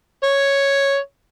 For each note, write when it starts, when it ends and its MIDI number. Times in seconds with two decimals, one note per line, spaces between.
0.23 0.98 73